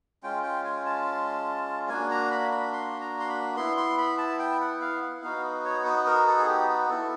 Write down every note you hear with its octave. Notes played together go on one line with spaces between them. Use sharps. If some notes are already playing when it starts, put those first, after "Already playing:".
G#3 C#4 F4 G5
G5
G#5
A5
A#3 D4 F#4 G#5
A#5
B5
B5
C6
A#5
C6
B5
B3 E4 C6
C6
B5
A5
G5
F#5
F5
F#5
B3 D#4 F#4 F5
C#5
B4
A#4
A4
G#4
G4
B3 E4 A4